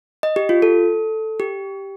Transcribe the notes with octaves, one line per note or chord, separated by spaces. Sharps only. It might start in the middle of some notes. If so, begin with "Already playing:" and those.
D#5
G4
F4
A4
G4